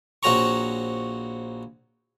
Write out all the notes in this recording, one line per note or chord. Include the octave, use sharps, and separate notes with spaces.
A#1 C4 F#4 C#5 A#5 C#6